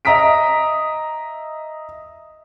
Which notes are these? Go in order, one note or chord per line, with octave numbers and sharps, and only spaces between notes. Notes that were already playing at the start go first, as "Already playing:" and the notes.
D#5 E5 A#5 D#6 B6 D7